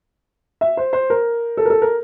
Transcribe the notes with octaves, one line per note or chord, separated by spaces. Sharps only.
E5
C5
C5
A#4
A4
A#4
A4
A#4